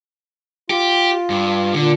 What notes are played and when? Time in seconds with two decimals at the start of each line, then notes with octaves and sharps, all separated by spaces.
0.70 F4 G4
1.30 G2
1.75 A#2 D3